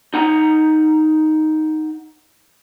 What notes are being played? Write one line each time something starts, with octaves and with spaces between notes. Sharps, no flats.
D#4 F#5 A#5